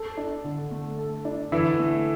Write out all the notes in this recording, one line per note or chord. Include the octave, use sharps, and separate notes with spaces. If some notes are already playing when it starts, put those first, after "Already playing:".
Already playing: A4
D4
D3
A3
A4
D4
D3 E3 E4
A3